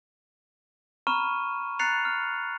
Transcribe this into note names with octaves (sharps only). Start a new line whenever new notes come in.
A#5 B5 C#6 F6 D#7 E7
A#5 F#6 A6 C7 C#7 F7
F6